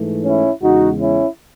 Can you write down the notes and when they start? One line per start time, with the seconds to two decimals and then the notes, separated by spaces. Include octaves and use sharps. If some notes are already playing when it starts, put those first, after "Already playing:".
Already playing: G#2 E3 A3
0.25 C#4 E4
0.63 E2 C#3 G#3 D#4 F#4
1.00 C#4 E4